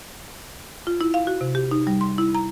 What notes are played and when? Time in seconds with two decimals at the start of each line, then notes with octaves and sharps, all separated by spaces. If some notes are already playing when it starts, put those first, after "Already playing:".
0.87 F4
1.01 E4
1.14 F5
1.27 F#4
1.41 C3
1.55 G4
1.71 D#4
1.87 G3
2.01 C6
2.18 E4
2.35 A#5